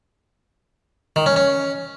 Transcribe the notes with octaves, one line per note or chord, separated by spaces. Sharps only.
D#3
C#4
C#4